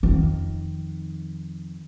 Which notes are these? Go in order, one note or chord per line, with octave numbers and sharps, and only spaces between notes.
F2 D#3